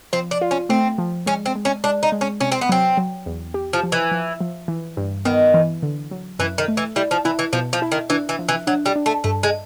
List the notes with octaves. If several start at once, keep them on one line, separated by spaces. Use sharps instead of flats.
F3 C4
D4
F4
C#4
A3 C4
F3
G#3 C#4
C4
G#3
C#4
G#3 D4
D#4
G#3
C#4
C3 C#4
C4
B3
F#3 C4
F#3
E2
G4
F3
F3
E3
F3
F3
E3
G2
D#3 B3
E3
D3
F#3
F#2 E3
D#3
A3
E3
G3 E4
F3
E3 E4
E3
B2 F3
F3
E4
D#3
E3 D4
E3
F3
E3
F#3 D4
G3
D4
A3
G2 A3
G#3